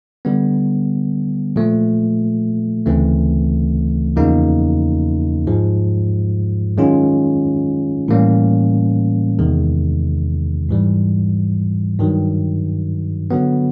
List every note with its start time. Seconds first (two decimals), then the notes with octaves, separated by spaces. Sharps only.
0.25 D3 G3 B3
1.56 A#2 F3 A3
2.86 D2 C#3 E3 A3 C4
4.16 E2 C#3 F3 A#3 D#4
5.47 G#2 F3 G#3
6.77 F#2 D#3 G#3 C#4 F4
8.08 A2 E3 G3 A#3 C#4
9.39 E2 C3 D#3 G#3
10.69 G#2 E3 G3
11.99 G2 D#3 F#3
13.31 D3 F#3 B3